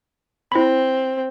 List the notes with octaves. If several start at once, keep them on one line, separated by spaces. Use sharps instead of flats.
C4 E4 B5